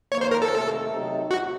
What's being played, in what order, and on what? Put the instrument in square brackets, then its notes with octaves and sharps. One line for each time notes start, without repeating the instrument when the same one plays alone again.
[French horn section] F2 D#3 A#3 [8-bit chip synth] C#5
[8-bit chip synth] C5
A#4
A4
[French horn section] C3 D#3 A3
C3 F#3 A3 D#4
[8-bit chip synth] F#4